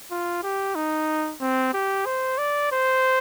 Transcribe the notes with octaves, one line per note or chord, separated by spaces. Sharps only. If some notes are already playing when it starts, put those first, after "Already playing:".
F4
G4
D#4
C4
G4
C5
D5
C5